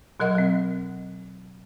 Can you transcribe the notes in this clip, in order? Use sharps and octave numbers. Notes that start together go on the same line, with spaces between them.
B2 F#3 A#4 D#5 F#5 F#6
F#3 C4